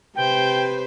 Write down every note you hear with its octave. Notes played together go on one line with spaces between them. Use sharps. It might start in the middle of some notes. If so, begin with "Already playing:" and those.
C3 B4 C5 G5